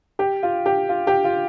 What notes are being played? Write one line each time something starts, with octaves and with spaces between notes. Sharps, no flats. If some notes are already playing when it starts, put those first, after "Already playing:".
G4
F4
G4
F4
G4
F4